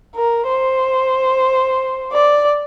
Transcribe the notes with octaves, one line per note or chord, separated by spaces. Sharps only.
A#4
C5
D5